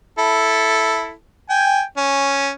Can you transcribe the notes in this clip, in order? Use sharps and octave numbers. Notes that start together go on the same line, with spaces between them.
E4 A4
G5 G#5
C#4